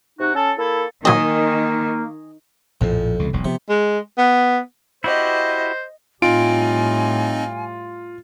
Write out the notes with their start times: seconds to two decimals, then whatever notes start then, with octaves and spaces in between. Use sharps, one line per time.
0.19 C3 D#4 F#4
0.34 C#4 A4
0.58 A#3 E4 A4
1.05 A#2 D#3 F#3 A#3 C4 D#5 G#5
2.81 A#1 F2 A2 F3
3.19 C#2 C3
3.33 E1 B1
3.45 C3 F3 B3
3.69 G#3
4.18 B3
5.04 E4 F#4 G4 C5 D#5
6.22 A2 G3 C4 D#4 F4 D#5 G#5 D7